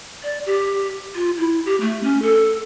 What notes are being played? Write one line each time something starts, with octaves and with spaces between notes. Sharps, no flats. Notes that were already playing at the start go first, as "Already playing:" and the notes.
D5
G4
F4
E4
G4
A3
C#4
A4